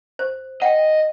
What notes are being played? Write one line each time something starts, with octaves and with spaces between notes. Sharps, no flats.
C5
D#5 F#5 G5